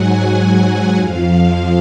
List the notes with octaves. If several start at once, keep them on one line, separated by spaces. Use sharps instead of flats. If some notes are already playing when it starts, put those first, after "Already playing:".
Already playing: G#2 F#3 F#5 G#5
F#5
F2 F3 F5